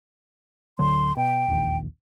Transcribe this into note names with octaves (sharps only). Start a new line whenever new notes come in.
D1 D3 F#3 C6
B2 G5
E1 A#1 D#2